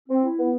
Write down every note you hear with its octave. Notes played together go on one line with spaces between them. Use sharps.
C4
E4
B3